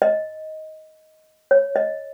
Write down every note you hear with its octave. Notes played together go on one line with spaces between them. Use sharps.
D#5
C#5
D#5